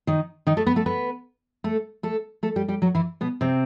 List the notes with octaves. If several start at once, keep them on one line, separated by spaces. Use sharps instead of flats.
D#3 D#4
D#3 D#4
A3 A4
B3 B4
A3 A4
B3 B4
A3 A4
A3 A4
A3 A4
G3 G4
G3 G4
F#3 F#4
E3 E4
B2 B3
C3 C4